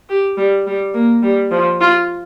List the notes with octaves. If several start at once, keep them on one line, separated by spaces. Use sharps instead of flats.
G4
G3
G3
A#3
G3
F3
F4